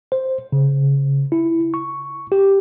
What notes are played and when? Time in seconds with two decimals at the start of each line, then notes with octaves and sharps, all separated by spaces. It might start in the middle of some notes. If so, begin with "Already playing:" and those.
0.12 C5
0.52 C#3
1.32 E4
1.74 C#6
2.32 G4